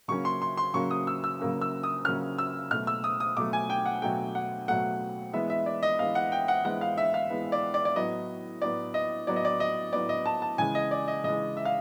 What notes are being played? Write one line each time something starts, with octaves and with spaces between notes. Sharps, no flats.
C#3 F#3 A#3 C#4 C#6
C6
C6
C6
C#3 F#3 A#3 C#4 C#6
D#6
E6
E6
C#3 F#3 A#3 C#4
E6
D#6
C#3 F#3 A#3 C#4 F6
E6
B2 F#3 A3 F6
E6
D#6
D#6
B2 F#3 A3 D6
G#5
G5
F#5
B2 F#3 A3 G5
F#5
B2 F#3 A3 F#5
E3 G#3 B3 E5
E5
D5
D#5
E3 G#3 B3 F5
F#5
G5
F#5
E3 G#3 B3 F#5
F5
E5
F5
E3 G#3 B3
D5
D5
D5
A2 F#3 B3 D#5
A2 F#3 B3 D5
D#5
A2 F#3 B3 D5
D#5
D5
D#5
A2 F#3 B3 D5
D#5
A5
A5
C#3 E3 G#3 G#5
D#5
D5
D#5
C#3 E3 G#3 D#5
E5
F5